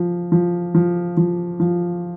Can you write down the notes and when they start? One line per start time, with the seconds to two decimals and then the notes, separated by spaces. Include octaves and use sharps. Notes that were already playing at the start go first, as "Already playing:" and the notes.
Already playing: F3
0.32 F3
0.75 F3
1.17 F3
1.60 F3